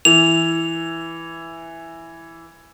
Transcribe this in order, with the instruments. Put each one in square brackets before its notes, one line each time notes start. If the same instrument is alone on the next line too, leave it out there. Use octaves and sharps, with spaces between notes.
[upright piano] E3 [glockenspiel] F7